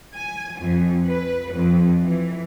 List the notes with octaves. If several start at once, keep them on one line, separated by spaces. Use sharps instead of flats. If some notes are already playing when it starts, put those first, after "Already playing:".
G#5
F2
B4
F2
E3